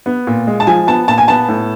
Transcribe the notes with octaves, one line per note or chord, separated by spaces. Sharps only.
B3
A#2
G#3
A5
F3 G#5
B3 A5
A#2 A5
G#5
B3 A5
A2